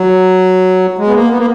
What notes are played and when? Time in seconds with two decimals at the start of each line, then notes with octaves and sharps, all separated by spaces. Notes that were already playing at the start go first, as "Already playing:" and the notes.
Already playing: F#3
0.99 G#3
1.08 B3
1.15 A#3
1.30 B3
1.38 A#3